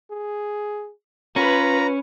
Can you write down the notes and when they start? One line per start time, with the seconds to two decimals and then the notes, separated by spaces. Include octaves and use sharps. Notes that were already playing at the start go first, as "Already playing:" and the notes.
0.11 G#4
1.36 C#4 F4 B4 A#5